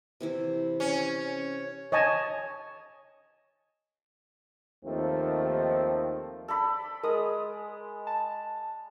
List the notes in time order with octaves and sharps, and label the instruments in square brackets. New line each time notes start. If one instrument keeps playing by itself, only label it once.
[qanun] C3 E3 E4
[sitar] C#4
[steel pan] C#5 D#5 G#5 A5
[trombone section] D#2 D#3 F3 A3 C4
[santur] A4 D5 B5
[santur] G#3 [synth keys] A#4 D#6
[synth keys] A5